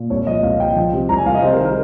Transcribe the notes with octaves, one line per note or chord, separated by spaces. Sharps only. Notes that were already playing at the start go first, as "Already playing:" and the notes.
Already playing: A#2
C2 C#5
F3 D#5
C2 F5
C2 G5
F3
C3
C2 A#5
G#5
C2 F5
D#5
C3 C5
A#4
D#3
A#4